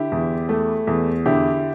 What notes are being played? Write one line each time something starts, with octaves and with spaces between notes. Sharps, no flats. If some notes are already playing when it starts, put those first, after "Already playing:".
Already playing: D3 E4 G4
E2
A3
E2
D3 E4 G4